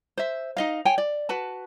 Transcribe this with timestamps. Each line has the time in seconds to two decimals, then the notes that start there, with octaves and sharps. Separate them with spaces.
0.18 C5 E5
0.57 D#4 D#5 F5
0.85 C#5 G5 G#5
0.98 D5
1.29 F#4 B4 A5